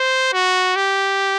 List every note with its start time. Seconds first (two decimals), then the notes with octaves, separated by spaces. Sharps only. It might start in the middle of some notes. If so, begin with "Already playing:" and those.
Already playing: C5
0.33 F#4
0.76 G4